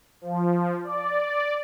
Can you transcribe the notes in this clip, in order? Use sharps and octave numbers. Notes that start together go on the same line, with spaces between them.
F3
D5